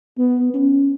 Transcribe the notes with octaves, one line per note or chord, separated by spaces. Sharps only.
B3
C#4